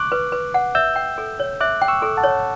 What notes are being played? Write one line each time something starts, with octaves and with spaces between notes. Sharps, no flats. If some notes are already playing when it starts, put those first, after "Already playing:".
Already playing: C#6 D6 F#6
B4
B4
F#5
E5 E6 G6
G5
A4
C#5
E5 D6 F#6
G5
C#6 E6
A4
F#5 A5
C#5